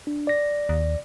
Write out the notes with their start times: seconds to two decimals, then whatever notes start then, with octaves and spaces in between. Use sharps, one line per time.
0.07 D4
0.27 D5 A#6
0.69 D#2